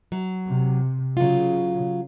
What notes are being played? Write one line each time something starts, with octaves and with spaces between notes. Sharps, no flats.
F#3
C3
C#3 F#3 F4